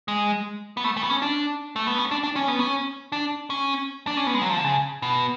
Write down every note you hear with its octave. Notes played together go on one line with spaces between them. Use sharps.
G#3
B3
A3
A3
B3
C#4
D4
A3
B3
C#4
D4
D4
C#4
B3
C#4
D4
C#4
D4
C#4
B3
G#3
F#3
F3
D3
C#3
B2